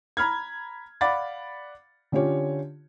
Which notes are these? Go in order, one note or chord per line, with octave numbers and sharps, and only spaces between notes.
A#5 B5 F6 G#6
D5 F5 F#5 B5 D6 A6
D3 C#4 F4 G4 C#5